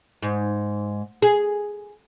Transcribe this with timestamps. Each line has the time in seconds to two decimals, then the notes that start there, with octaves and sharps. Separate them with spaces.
0.23 G#2
1.22 G#4